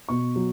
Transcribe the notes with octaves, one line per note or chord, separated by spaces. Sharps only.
B2 C#6
F#3